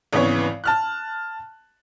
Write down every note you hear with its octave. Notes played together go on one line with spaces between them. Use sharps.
G#1 C#3 E3 B3 C#5
A5 F6 F#6